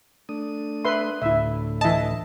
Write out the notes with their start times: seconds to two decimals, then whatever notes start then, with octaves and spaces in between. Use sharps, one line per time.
0.29 A3 D4 D#6
0.85 B4 E5 C6
1.22 D2 A2 E4 E5
1.81 E3 D#5 E5 A5